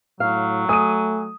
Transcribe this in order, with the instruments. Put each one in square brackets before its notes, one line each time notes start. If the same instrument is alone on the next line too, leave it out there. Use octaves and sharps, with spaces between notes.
[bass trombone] A2 [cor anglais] F#3 [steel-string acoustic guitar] F5
[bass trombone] A3 [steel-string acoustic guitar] G#5 [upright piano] D#6 D#7